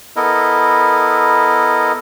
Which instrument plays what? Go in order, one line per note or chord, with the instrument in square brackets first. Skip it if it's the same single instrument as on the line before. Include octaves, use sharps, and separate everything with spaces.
[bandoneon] B3 E4 A4 A#4 D#5